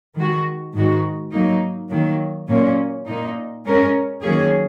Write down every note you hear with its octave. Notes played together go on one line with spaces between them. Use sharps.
D#3 G#3 F#4
G#2 D#3 G#3 D#4 F#4
F#3 A#3 D#4
D#3 F#3 A#3
A#2 F#3 A#3 C#4
A#2 A#3 D#4
G#3 C#4 A#4
D#3 F#3 A#3 C#4 G#4